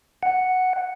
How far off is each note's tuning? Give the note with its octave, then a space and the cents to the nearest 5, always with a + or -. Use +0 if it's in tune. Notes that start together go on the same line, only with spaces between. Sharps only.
F#5 +0